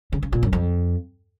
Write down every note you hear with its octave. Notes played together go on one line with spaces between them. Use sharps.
C#3
C#3
A#2
F#2
F2